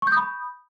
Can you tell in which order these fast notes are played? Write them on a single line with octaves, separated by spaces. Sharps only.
C#6 G6 D#6 B5